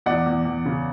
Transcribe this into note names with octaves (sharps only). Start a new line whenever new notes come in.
E2 D5 F#5
E2
E2
C#3